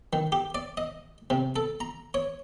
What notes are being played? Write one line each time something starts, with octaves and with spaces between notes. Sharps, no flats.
D#3
G4
D5
D#5
C3
A4
A#5
C#5